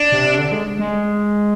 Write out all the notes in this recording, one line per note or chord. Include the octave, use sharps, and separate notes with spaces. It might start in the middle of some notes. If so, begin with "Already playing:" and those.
Already playing: D4
C3
D3
G#3
G#3